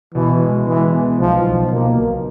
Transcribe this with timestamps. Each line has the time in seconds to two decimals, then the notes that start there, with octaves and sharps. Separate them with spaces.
0.14 B2 E3
0.40 G#3
0.67 E3 G#3
0.92 B3
1.19 B1 F3
1.45 B1
1.71 B2 A#3
1.97 B1